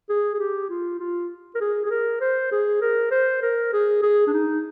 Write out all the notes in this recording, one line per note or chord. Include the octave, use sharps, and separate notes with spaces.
G#4
G#4
G4
F4
F4
A#4
G#4
G#4
A#4
C5
G#4
A#4
C5
A#4
G#4
G#4
D4
D#4